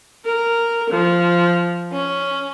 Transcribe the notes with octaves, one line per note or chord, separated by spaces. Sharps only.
A#4
F3
C#4